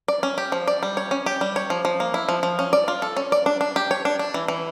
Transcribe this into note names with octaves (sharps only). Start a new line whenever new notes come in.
D5
C#4
G4
F3
D5
G3
C#5
C#4
G4
G3
C#5
F3
F3
A#3
E4
F3
F3
C#4
D5
F4
A4
C#4
D5
D4
D4
G4
C#5
D4
D4
E3
E3